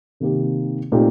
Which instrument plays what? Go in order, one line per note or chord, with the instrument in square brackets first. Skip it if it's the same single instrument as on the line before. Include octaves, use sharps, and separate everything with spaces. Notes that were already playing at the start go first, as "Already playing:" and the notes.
[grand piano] C3 D#3 A#3 D#4 G4
A#2 A3 C4 D#4 G4